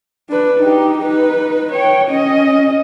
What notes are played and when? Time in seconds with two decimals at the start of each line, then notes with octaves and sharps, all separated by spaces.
0.30 D4 B4
0.59 D#4 G4
0.98 D#4 B4
1.72 C#5 G5
2.07 C#4 D#5